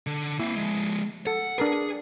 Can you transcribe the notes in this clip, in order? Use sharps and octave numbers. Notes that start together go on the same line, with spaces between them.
D3
A#3 C4 E4
F3 G#3
A4 F#5
D4 G#4 A#4 B4